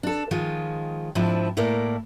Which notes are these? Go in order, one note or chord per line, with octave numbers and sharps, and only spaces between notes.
D4 A4
D#3 F3 G#3 F4
G#2 F3 C4 D4 E4
A2 A#3 E4 A#4 D5